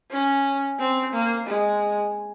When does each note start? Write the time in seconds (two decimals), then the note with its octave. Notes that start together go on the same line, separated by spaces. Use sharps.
0.10 C#4
0.79 C4
1.13 A#3
1.47 G#3